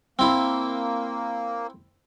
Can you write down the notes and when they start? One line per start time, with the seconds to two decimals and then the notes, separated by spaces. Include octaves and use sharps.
0.19 A#3 C4 E4